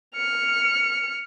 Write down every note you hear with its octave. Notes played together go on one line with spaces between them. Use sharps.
F6 C#7